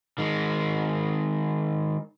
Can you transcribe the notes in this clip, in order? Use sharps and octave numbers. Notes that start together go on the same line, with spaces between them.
D#3 G#3